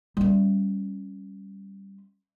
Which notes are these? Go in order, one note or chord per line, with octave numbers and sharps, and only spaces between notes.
G3 C#4